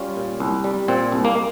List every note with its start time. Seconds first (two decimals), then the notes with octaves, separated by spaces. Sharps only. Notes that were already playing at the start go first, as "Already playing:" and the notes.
Already playing: G3 C#4 F4
0.16 A#2
0.40 C2
0.64 G3
0.88 A#2 C4
1.12 C2
1.25 A#3